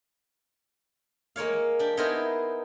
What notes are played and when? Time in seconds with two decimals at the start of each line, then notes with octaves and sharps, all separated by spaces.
1.36 G#3 A#3 C#5 F5
1.79 D4 G4
1.97 B3 D#4 E4 G#4 A#4 C5